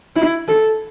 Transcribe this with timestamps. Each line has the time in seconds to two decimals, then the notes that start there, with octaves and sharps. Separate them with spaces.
0.16 E4
0.48 A4